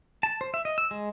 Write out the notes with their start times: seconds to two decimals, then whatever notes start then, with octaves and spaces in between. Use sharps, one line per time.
0.23 A5
0.41 C5
0.54 E5
0.65 D#5
0.78 E6
0.91 G#3